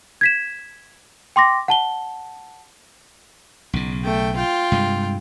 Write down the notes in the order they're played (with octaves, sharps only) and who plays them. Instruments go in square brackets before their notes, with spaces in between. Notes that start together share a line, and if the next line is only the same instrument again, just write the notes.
[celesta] G#6 B6 E7
G5 C6 D6 A#6
F#5 A5 G7
[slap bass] B1 C#3
[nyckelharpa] A3 G5
F4 G5
[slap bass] G2 C3 G#3